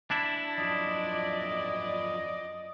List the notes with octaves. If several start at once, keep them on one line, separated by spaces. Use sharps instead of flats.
D4 E4 A5
F#2 F3 F#3 D5 D#5